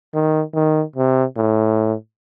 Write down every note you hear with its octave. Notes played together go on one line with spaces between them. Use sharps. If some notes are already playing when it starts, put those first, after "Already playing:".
D#3
D#3
C3
A2